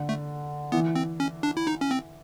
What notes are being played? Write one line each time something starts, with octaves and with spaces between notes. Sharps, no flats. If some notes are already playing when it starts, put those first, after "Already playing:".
Already playing: D3
A3
E3 B3
C4
C#4
D4
E4
D#4
C#4
C4